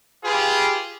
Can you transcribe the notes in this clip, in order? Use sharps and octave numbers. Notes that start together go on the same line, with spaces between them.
F4 G4 G#4 B4